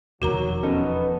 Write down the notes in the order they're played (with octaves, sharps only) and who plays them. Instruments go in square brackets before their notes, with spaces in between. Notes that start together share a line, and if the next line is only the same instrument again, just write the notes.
[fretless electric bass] E1 F2 D#3 [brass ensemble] F#3 [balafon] F#4 A#4 A#5
[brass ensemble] B3 [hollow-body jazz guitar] C#4 D#4 A4